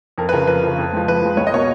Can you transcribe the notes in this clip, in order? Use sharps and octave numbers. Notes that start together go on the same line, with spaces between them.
F2 A#4
B4
C#3 F3 A#4
F2 B4
C#3 F3
F2
F3 G#3
F2 B4
F3 G#3
C#2 C#5
D#5
B2 A#3 C#5